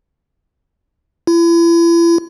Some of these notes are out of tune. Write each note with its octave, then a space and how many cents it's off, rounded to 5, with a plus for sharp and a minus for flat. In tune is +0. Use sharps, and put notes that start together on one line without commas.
E4 +40